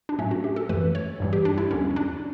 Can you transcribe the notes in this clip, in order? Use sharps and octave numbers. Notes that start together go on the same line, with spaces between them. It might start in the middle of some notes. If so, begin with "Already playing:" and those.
D4
A2 F#3 A3 C#4
F#4
G4
A4
F#2 E3 A3 B4
C#5
G2 E3 G3
G4
D4
E4
E2 D3 G3 C#4
C#4
D4